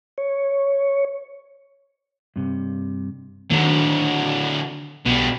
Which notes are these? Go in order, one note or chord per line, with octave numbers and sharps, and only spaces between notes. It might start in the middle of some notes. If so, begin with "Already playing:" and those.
C#5
G2 C3
D3 D#3 F#3 A#3
B1 B2 G3